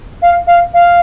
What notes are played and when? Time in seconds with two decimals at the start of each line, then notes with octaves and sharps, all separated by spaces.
0.22 F5
0.47 F5
0.74 F5